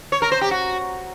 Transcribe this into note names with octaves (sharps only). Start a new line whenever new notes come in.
C#5
A#4
C5
G4
F#4